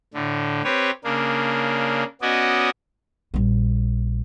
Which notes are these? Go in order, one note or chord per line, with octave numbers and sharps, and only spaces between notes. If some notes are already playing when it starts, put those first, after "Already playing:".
A2 D3
C4 G4 B4 C#5
C#3 A#3 D4
B3 C#4 F#4 D5 D#5
A#1 G3